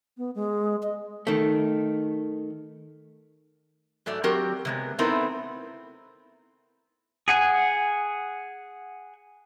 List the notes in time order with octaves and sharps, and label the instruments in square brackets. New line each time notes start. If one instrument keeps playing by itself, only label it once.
[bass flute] B3
G#3
D#5
[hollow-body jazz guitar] D#3 A3
[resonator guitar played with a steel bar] G#2 F#3 A3 D5
F#3 C4 F#4 G4 A#4
C3 G#3 B3
A3 B3 C4 D#4 E4 A#4
[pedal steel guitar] G#4 F#5 G#5